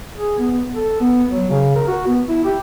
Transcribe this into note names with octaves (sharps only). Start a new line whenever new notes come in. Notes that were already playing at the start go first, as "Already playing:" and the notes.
G#4
B3
A4
B3
F#3
C#3
A#4
F#4
B3
E4
G4